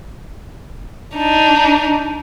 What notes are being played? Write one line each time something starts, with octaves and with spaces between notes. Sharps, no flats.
D4 D#4